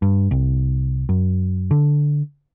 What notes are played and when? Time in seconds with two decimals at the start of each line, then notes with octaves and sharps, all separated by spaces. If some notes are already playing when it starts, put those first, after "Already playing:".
0.02 G2
0.31 C2
1.09 F#2
1.71 D3